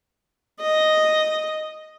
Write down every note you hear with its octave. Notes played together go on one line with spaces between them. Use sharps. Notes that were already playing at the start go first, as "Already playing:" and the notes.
D#5